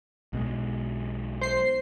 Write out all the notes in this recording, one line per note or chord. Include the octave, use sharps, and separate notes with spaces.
B1 B2 G#3
C5 C7